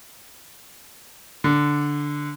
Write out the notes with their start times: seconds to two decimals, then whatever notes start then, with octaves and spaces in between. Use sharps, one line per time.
1.44 D3